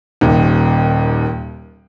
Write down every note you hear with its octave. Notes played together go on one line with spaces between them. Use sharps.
D#1 D#2